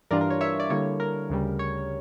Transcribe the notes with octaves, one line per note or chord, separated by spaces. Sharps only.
G2 E3 G3 D4 F4 A#4 D5
A#4
C#5
C#5 E5
D5
D3 G3 A#3 E4 C#5
A#4
D2 C#3 G3
C#5